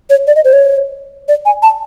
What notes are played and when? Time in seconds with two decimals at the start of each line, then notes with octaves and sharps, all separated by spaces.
0.10 C#5
0.27 D5
0.36 D#5
0.45 C5
0.53 C#5
1.28 D5
1.46 G#5
1.63 A5